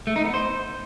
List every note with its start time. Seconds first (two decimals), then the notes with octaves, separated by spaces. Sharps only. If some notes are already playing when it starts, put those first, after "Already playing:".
0.07 A3
0.16 D#4
0.25 B3
0.34 C5